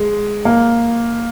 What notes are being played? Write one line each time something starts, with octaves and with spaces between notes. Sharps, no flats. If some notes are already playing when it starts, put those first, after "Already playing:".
Already playing: G#3
A#3